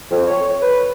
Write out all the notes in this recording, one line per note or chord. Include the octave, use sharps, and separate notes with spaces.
F2
C#5
B4